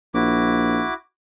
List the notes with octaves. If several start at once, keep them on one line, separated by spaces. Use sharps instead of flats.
A#1 E4 F#4 D6